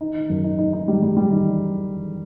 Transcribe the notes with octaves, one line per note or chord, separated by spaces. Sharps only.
D#4
D#4
F#2
D#4
D#4
D#4
G3
G3
G3
D#4